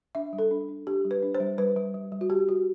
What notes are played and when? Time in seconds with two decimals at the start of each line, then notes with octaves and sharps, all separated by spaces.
0.15 D4 E5
0.33 G3
0.39 A4
0.51 D4
0.69 D4
0.87 D4 G4
1.05 G3
1.11 B4
1.23 D4
1.35 C5
1.40 G3
1.58 G3 B4
1.76 G3
1.94 G3
2.12 G3
2.21 F#4
2.30 G3 G4
2.48 G3 F#4